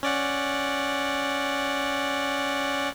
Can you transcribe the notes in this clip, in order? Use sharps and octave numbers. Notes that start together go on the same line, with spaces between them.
C#4 D5 F#5